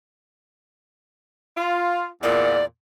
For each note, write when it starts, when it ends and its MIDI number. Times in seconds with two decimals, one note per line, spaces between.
1.57 2.06 65
2.23 2.62 40
2.23 2.62 46
2.23 2.65 74